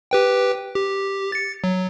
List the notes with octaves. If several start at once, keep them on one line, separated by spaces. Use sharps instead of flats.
G4 B4 G5
G4
A6 C#7
F#3